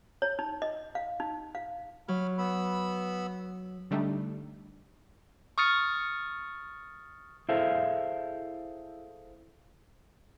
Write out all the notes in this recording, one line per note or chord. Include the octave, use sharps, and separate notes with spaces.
C#5
D#4
D#5
F5
D#4
F5
F#3 B5 F6
B3 B5 E6
D3 G3 A3 D4 D#4
C#6 D#6 F6 A6 C#7
E4 G#4 A4 C5 E5 F5